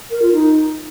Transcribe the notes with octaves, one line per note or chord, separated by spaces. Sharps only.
A#4
F4
D#4